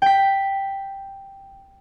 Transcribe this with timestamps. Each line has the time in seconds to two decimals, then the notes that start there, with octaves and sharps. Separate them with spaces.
0.02 G5 B6